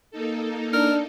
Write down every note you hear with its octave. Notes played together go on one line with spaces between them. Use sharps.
A#3 D#4 A4
D4 A#4